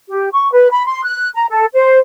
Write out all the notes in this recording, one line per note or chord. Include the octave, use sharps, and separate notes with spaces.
G4
C#6
B4
B5
C6
F#6
A#5
A4
C5